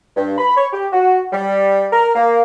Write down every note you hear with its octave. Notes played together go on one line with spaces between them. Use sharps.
G2
B5
C#5
G4
F#4
G3
A#4
A#3